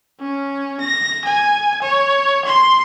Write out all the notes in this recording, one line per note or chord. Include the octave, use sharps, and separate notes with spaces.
C#4
A#6
G#5
C#5
C6